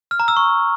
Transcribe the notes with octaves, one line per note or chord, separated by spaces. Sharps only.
F6
A#5
E6
C#6